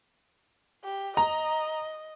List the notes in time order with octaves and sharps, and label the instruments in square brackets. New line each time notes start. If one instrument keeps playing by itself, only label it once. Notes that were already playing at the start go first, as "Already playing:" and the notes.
[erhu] G4
[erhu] D#5 [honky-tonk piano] A#5